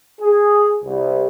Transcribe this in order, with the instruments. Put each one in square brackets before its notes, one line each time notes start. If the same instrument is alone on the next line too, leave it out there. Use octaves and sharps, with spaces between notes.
[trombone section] G#4
C2